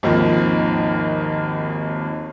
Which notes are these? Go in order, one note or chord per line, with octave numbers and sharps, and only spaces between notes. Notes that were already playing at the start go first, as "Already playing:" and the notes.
G#1 D#2 D#3 F3